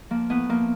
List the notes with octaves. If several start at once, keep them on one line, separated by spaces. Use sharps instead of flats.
F3 A#3
A2 B3
F3 A#3